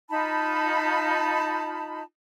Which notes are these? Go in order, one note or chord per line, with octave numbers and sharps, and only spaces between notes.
D#4 F4 A5 B5